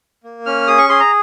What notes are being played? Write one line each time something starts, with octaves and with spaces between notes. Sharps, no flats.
A#3
C#4 F6
G#4 D#6
C#6
G#4 C6
A#5